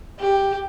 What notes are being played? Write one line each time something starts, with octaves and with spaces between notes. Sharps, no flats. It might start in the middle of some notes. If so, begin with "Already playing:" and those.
G4